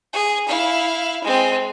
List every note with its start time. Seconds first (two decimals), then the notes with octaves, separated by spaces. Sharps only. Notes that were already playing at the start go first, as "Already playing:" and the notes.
0.13 G#4
0.47 E4 F5
1.24 G#3 C4